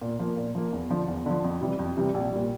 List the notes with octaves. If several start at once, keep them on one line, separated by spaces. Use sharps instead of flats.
A#2
F3 A#3
A#2
F3 A#3
E2
D3 F3
E2
D3 F3
F2
C3 E3 G3
F2
C3 E3 G3
A#1
A#2 G3